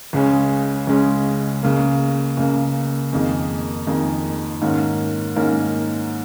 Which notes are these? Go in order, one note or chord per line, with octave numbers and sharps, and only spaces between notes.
C#2 C#3 G#3 C#4
C#2 C#3 G#3 C#4
C#2 C#3 A#3
C#2 C#3 A#3
F2 D#3 A#3 D#4 G#4
F2 D#3 A#3 D#4 G#4
G#2 D#3 A#3 C#4 A#4
G#2 D#3 A#3 C#4 A#4